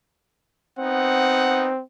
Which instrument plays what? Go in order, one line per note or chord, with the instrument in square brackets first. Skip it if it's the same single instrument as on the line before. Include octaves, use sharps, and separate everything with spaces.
[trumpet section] B3 D#4 F#5 [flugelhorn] C4